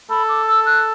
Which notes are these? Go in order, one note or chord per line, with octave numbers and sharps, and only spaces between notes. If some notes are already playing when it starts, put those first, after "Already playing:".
A4 B5
D6
E6
F#6